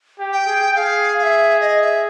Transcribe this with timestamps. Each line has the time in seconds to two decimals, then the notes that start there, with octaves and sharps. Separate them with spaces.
0.19 G4
0.33 G5
0.46 G#4
0.75 G#4 F5
1.19 F5
1.23 E5
1.60 D#5
1.82 E5